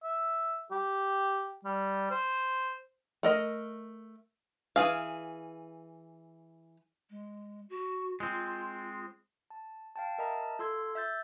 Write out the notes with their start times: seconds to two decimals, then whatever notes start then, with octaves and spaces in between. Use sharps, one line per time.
0.04 E5
0.71 G4
1.65 G3
2.11 C5
3.23 A3 A#4 D#5
4.76 E3 G#4 F5
7.10 G#3
7.69 F#4
8.20 G#3 C4 F4
9.50 A5
9.96 F5 G5 A5
10.18 A#4 D#5 E5 A5 A#5
10.59 F4 A4 C6 E6 G#6
10.95 E5 E6 G6 A6